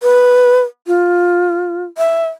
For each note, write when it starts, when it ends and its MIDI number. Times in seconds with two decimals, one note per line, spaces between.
0.03 0.60 71
0.87 1.83 65
1.98 2.27 76